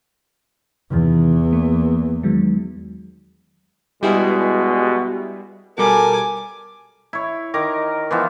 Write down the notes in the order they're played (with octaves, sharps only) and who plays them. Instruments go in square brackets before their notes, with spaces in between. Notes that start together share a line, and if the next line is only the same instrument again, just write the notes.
[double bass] E2 [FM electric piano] C3 D#3 E3
[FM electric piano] A#3
D#3 F#3 G#3
[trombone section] G2 B2 G#3 [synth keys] G3 E4 G#4
[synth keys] B2 G3 [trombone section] A4 A#4 [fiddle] G#5 D6
[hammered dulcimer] E4 C#5
D#3 A#4 D6
E3 F3 B3